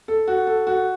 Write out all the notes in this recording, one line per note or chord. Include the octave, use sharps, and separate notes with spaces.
A4
F#4
A4
F#4